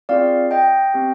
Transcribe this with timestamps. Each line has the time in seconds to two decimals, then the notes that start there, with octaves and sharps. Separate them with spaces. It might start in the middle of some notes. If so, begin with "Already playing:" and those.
0.09 C4 F4 G#4 D5 F5
0.51 D#5 G5
0.94 C4 G4